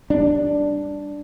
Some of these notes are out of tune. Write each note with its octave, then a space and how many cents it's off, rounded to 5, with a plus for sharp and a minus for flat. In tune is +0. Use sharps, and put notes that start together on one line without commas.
G3 +10 D4 +0